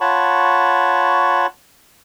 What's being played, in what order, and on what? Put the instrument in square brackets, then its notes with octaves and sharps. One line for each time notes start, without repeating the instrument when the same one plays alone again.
[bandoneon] F4 C#5 F#5 A5 B5 C#6